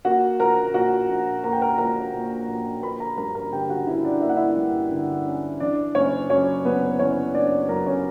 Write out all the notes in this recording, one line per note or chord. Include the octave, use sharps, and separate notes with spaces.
A#3 F#4 F#5
A#1 A#4 A#5
A#2 F#4 F#5
A#1
A#3 A#5
G5
A#4 A#5
A#1 A#4 A#5
A#2
A#1
A#3 B4 B5
A#4 A#5
G2 A#4 A#5
A#4 A#5
D3 G4 G5
F#4 F#5
C#4 E4 E5
D4 D5
A#3 E5
F#5
E4 E5
G2
D3
C#4
E3 D4 D5
F#1 C#4 C#5
F#2 C#4 C#5
F#1 B3 B4
E3 C#4 C#5
F#1 D4 D5
F#2 A#4 A#5
C#4 C#5